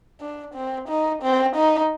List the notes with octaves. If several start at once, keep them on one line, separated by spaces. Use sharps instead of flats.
D4
C4
D#4
C4
D#4